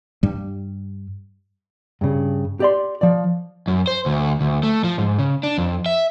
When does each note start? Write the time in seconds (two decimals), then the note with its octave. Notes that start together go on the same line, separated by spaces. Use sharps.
0.23 G2 G3
2.01 G2 C#3
2.60 G4 D5 C6
3.01 F3 D5
3.68 F#2
3.87 C5
4.06 D2
4.41 D2
4.63 A3
4.84 F3
4.98 G#2
5.19 C#3
5.43 D4
5.58 F2
5.86 E5